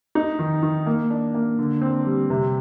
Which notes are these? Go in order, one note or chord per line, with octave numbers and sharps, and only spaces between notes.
D#4
D#3
D#3
A#3
D4
A#3
D3
C4
G3
C3